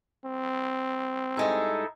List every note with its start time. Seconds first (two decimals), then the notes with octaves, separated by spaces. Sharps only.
0.24 C4
1.37 G2 G#3 D#4 E4 G#4 A4